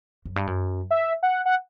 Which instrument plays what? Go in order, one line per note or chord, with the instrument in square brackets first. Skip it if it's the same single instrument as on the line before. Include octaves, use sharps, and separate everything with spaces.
[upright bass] F#2
G2
F#2
[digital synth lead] E5
F#5
F#5